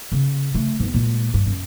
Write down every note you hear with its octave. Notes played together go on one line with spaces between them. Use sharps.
C#3
C#3 A3
E2 G#2
A#2 G#3
G2
F#2